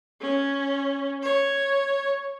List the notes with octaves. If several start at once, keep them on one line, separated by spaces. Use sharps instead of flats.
C#4
C#5